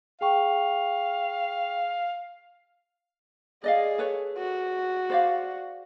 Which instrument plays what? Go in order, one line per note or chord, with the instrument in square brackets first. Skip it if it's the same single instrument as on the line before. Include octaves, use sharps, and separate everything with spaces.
[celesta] G#4 G5 C#6 [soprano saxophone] F5
[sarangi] G#4 [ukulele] D5 D#5 F5
[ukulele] A4 B4 C#5
[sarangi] F#4
[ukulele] C5 D5 F5